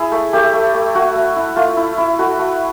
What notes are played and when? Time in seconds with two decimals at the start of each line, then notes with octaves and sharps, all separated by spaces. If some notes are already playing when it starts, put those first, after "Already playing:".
Already playing: E4 G#4
0.12 A3
0.33 A3 G4
0.53 A3
0.74 A3
0.95 A3 F#4
1.16 A3
1.36 E4
1.56 A3 F4
1.77 E4
1.98 E4
2.19 A3 F#4
2.39 A3